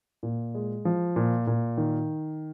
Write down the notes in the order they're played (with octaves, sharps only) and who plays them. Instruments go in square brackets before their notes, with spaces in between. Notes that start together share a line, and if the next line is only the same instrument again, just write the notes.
[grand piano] A#2
G#3
F3
A#2
A#2
D#3